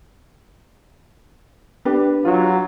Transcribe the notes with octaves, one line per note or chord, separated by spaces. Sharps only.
D4 G4 B4
F#3 F4